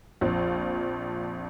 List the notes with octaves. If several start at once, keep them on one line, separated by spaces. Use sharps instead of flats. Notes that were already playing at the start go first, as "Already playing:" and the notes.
A#1 F2 F3